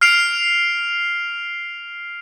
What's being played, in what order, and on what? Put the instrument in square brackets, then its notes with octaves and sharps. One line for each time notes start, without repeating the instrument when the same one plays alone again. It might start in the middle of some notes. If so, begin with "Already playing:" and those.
[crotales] F6 C7 D7 F7